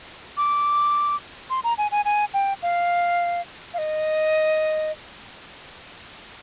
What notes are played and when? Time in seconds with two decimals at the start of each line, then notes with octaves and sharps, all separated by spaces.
0.37 D6
1.50 C6
1.64 A#5
1.78 G#5
1.91 G#5
2.05 G#5
2.34 G5
2.63 F5
3.74 F5
3.78 D#5